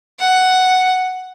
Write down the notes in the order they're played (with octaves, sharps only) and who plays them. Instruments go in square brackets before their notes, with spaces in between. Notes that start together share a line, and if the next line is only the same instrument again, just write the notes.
[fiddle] F#5